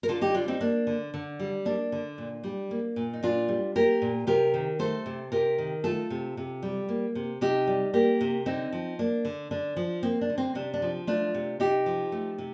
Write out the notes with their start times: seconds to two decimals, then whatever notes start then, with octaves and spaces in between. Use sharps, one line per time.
0.03 A#4
0.08 D3 F4 A4
0.21 D#4 G4
0.34 G3 D4 F4
0.48 C4 D#4
0.61 A#3 D4
0.87 D3
1.14 D3
1.39 G3
1.65 A#3 D4
1.92 D3
2.18 A#2
2.44 G3
2.71 A#3
2.96 A#2
3.13 D#4
3.23 A#2 D4 F4
3.48 G3
3.75 A#3 G4 A#4
4.02 A#2
4.27 C3 G4 A#4
4.54 D#3
4.79 A3 A4 C5
5.06 C3
5.32 C3 G4 A#4
5.58 D#3
5.84 A3 F4 A4
6.10 C3
6.37 C3
6.63 G3
6.89 A#3
7.15 C3
7.41 C3 D#4 G4
7.67 G3
7.93 A#3 G4 A#4
8.21 C3
8.46 D3 C4 D#4
8.72 F3
8.99 A#3 D4
9.25 D3
9.51 D3 D4
9.77 F3
10.03 A#3 C4
10.21 D4
10.29 D3
10.38 C4
10.55 C3 D4
10.74 D4
10.82 F3
11.07 A3 D4 F4
11.34 C3
11.60 C3 D#4 G4
11.86 F3
12.12 A3
12.38 C3